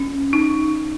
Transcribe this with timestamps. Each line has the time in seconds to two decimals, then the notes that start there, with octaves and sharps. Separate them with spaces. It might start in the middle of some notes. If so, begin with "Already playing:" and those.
Already playing: C#4
0.33 D#4